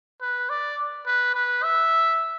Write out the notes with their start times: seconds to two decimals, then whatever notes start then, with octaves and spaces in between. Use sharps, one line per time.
0.21 B4
0.50 D5
1.07 B4
1.35 B4
1.63 E5